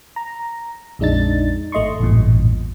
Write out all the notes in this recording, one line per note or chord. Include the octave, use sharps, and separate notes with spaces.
A#5
A#1 F2 G#3 D4 D#4 A6
G#1 A3 D#5 C6 C#6
A1 E2 G2 A#2